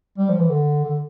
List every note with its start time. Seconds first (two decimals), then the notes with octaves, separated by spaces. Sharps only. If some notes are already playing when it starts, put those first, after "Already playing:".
0.18 G3
0.29 F3
0.39 E3
0.49 D3
0.84 D3